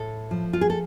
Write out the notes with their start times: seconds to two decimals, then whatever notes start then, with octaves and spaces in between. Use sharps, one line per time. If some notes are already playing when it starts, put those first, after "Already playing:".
Already playing: A2 A4
0.31 F3
0.53 F4
0.61 G#4
0.70 A4